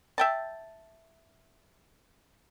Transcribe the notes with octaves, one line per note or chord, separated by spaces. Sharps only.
E5 G5 A5